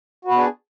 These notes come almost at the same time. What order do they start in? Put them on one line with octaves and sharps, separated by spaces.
F#4 B4 B3 D4 G#4